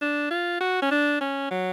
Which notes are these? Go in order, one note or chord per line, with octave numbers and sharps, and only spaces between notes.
D4
F4
F#4
C#4
D4
C#4
F#3